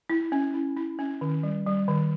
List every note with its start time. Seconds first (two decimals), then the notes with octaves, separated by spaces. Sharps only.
0.10 E4
0.32 C#4
0.54 E4
0.76 E4
0.99 C#4
1.21 D#3
1.43 G3
1.66 G3
1.88 D#3